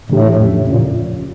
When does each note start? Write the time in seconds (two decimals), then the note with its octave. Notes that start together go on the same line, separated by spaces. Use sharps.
0.09 A2 C#3 E3 A3 D4 G4
0.39 E2 C#3 F3 C#4
0.67 A#2 C#4